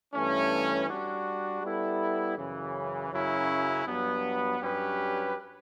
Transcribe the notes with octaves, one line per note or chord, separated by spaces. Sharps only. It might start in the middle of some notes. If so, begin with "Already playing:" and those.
G2 E3 A3 C#4
G3 D4 F#4
G3 B3 E4 A4
F#2 C#3 E3
F#2 C#3 F#3 C#4 E4
G2 F#3 B3
G2 F#3 C#4 G4 B4